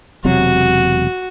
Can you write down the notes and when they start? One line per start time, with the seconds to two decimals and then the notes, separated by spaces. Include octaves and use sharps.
0.25 E1 C3 F#3 F#4